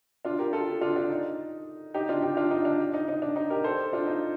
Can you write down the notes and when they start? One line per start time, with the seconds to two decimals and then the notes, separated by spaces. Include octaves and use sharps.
0.25 D4 F4
0.39 G4 A#4
0.53 F4 A4
0.81 D4 F4
0.96 D4
1.10 D#4
1.94 D#4 G4
2.09 D4 F4
2.23 D#4 G4
2.37 D4 F4
2.51 D#4
2.65 D4
2.94 D#4
3.08 D#4
3.22 D4
3.36 D#4
3.50 G4 A#4
3.64 A4 C5
3.93 D4 F4
4.07 D#4